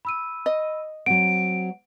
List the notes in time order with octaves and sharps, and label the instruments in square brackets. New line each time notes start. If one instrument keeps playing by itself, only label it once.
[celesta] B5 E6 D#7
[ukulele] D#5
[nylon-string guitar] F#3 C4 [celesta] F#5 [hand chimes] D7